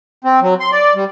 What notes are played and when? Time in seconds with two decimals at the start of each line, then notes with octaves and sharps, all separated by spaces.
0.24 C4
0.42 F#3
0.60 C6
0.72 D5
0.95 G3